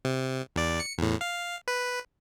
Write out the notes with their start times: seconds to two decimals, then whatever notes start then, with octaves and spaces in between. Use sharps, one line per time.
0.05 C3
0.56 E2 D5
0.80 C#7
0.98 E2 A2
1.21 F5
1.68 B4